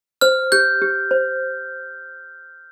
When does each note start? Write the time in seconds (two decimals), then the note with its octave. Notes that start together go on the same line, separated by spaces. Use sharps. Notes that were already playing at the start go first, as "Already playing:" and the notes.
0.21 C5 F6
0.52 G4 G6
0.82 G4
1.11 C5